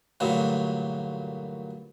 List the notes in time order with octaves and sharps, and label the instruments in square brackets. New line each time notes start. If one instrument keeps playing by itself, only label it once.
[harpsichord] D2 G2 A#2 E3 F#3